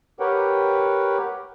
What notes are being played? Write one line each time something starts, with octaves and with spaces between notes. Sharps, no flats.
G4 A#4 B4 C#5 F#5 G5